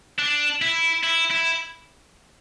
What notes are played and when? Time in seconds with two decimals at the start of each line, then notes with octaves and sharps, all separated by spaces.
0.19 D4
0.62 E4
1.04 E4
1.31 E4